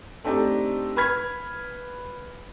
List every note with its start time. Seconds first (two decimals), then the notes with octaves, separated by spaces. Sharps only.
0.24 A3 C4 D4 D#4 G4
0.96 B4 B5 F6 G#6 B6